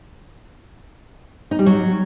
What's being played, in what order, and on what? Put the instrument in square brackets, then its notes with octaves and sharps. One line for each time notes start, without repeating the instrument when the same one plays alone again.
[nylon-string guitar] D#4
G3
F#3